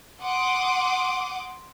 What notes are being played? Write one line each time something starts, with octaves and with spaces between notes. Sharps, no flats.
F#5 C6 D6 D#6